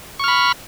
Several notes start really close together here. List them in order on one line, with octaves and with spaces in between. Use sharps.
C#6 F6 B5